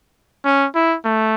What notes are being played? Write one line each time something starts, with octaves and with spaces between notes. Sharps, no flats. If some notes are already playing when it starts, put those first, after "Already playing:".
C#4
E4
A3